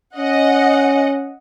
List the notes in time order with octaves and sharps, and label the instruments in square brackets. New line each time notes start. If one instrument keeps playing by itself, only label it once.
[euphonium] C#4 [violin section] D#5 F#5